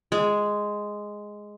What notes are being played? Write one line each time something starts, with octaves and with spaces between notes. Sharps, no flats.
G#3